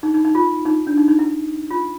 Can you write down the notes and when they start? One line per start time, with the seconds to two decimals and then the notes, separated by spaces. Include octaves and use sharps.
0.03 D#4
0.14 D#4
0.25 D#4
0.35 F4
0.65 D#4
0.87 D4
0.97 D#4
1.08 D#4
1.19 E4
1.71 F4